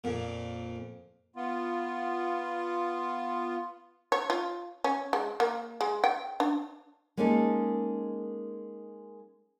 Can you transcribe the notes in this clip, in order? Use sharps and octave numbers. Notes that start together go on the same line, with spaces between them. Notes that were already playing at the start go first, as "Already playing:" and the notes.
F2 A#2
B3 F4
C#5
F4
C#4
G#3
A#3
G#3
G5
D4
G#3 A#3 C#4 D#4 A4